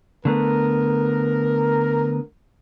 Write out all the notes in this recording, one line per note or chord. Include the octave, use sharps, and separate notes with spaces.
D3 A3 B3 A#4